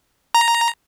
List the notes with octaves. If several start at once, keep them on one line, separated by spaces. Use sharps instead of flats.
A#5